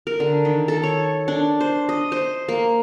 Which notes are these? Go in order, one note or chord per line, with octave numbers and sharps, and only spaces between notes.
A#4
D3
D#3
A4
C#5
D4
C5
D#5
C5
A#3